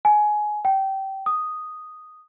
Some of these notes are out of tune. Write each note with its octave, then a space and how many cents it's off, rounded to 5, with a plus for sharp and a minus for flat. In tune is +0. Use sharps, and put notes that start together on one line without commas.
G#5 +20
G5 -20
D#6 -5